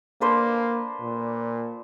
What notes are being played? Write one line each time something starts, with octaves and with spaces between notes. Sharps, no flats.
A#3 D4 B4 C5
A#2